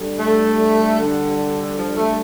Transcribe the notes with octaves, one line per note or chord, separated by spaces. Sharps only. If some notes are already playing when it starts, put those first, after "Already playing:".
Already playing: G3 D4 A4
A3
D3
F3
A3